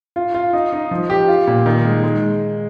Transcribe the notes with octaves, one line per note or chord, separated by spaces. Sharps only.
F4
F4
D#4
D#4
F3
G4
F4
A#2
D#3
G#3
G#3